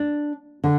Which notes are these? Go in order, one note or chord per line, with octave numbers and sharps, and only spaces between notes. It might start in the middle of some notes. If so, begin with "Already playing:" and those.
Already playing: D4
D3